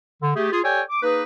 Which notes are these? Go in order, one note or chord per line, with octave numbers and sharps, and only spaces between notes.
D3
A3 G4 G#4
F4 G#4
G4 A4 C#5 D5 G5 G#5
D6
A#3 D#4 G#4 B4